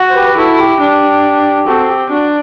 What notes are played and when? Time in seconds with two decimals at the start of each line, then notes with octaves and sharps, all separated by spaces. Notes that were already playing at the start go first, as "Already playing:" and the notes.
Already playing: F#4
0.10 C5
0.15 G4 B4
0.28 B4
0.37 E4 F#4 A4
0.58 G4
0.80 D4
1.66 C4 F#4 A4
1.88 G4
2.10 D4 F#4